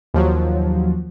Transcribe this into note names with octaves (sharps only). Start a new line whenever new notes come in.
D#2 F3 F#3